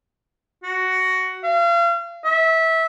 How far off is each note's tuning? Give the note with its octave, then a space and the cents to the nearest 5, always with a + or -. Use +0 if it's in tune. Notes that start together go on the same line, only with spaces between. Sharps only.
F#4 +10
F5 -35
E5 -20